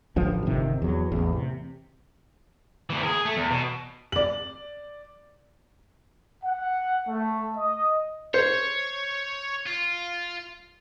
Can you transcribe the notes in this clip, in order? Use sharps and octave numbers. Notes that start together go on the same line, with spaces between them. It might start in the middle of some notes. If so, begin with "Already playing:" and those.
A1 D2 G2 F3
G1 C3 D#3
E2 F#3
A1 E2
C3
D2 E3
G#4 A#4
A3
E2
B2
D5 F#7
F#5
A3
D#5
C5 C#5
F4